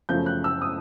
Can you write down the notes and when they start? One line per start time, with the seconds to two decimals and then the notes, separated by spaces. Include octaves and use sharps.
0.09 F#2 C#3 F3 A3 G6
0.26 F#6
0.44 E6
0.62 D#6